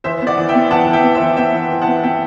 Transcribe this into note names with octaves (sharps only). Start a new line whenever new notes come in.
E3 C5 E5
B3
D5 F#5
E3
E5 G5
B3
E3 F#5 A5
E3
E5 G5
B3
C5 E5
E3
B3 E5 G5
E3
E3
F#5 A5
B3
B3 E5 G5